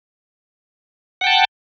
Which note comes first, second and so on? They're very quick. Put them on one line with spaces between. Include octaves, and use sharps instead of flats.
F#5 G5 A5